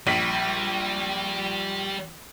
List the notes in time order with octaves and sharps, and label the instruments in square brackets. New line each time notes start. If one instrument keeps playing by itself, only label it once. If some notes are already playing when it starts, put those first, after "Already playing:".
[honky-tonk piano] A#1 B6 [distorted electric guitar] G3